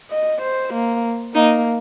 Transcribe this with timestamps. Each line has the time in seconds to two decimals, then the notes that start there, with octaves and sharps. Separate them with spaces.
0.11 D#5
0.42 C5
0.73 A#3
1.35 A#3 D#4